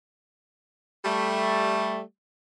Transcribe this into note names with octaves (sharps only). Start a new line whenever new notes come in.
G3 A3